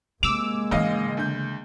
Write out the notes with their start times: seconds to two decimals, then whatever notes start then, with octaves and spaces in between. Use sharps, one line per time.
0.23 C3 G#3 A#3 D6 E6 F7
0.71 G#1 C#3 E3 D#5 F5
1.17 D2 G6